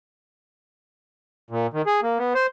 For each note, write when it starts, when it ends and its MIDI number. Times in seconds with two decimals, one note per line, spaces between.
1.50 1.67 46
1.74 1.82 51
1.86 2.00 68
2.03 2.18 58
2.18 2.33 59
2.35 2.47 72